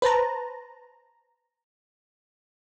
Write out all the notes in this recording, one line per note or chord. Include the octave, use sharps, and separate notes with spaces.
B4 C5 A5 A#5